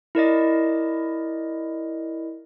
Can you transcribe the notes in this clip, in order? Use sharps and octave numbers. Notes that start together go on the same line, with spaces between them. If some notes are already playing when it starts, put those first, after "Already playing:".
E4 A#4 D5 D#5